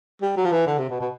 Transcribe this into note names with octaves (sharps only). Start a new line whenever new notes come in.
G3
F#3
F3
E3
D3
C3
B2
B2